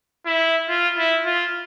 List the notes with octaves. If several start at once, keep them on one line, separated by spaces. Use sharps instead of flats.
E4
F4
E4
F4